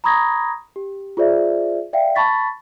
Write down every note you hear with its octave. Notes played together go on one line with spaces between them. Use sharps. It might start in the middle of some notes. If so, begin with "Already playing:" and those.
A#5 B5 C#6 D#6 G#6 A#6
G4
F4 G#4 C5 D5 E5
D5 E5 F5 G5
A5 B5 C#6 A6 B6